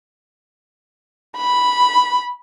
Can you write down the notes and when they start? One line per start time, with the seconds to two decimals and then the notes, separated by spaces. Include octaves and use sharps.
1.37 B5